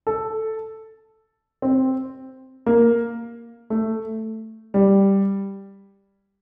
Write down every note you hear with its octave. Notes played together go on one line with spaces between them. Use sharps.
A4
C4
A#3
A3
G3